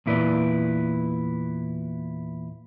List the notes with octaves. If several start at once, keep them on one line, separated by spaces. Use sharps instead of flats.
E2 A#2 E4 B4 D5